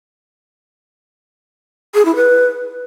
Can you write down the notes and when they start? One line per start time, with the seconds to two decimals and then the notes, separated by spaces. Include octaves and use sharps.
1.95 G#4
2.05 E4
2.16 B4